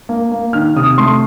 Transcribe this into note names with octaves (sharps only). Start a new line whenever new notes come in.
A#3
A#3
D#3 F6
C3 D#6
A3 C6